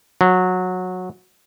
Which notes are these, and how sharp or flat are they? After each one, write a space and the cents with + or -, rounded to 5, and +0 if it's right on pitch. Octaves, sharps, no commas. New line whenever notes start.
F#3 -15